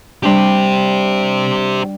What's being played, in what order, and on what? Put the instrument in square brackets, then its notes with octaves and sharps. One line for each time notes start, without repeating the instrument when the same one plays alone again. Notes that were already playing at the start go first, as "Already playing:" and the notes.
[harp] G3 D4 [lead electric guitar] G4 C5